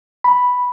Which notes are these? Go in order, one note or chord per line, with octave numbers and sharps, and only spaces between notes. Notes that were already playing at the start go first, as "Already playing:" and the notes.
B5